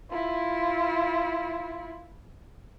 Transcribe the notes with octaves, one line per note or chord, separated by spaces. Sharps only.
E4 F4